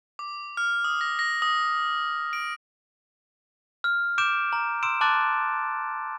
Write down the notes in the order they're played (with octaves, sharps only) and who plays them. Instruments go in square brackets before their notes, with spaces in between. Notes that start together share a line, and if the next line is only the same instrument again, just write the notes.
[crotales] D6
F6
D#6
A#6
A#6
D#6
D7
[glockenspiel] F6
D6 G6 D7 E7
A#5
C6 E6 D7 E7
A5 C6 D6 F#6 A6